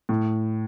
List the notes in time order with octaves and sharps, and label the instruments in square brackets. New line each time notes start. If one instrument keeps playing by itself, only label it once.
[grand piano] A2